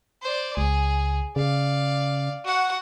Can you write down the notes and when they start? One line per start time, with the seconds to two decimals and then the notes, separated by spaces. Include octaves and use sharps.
0.23 C5 D5
0.57 C#2 G#4
1.36 C#3 D5 F5
2.45 F#4 F#5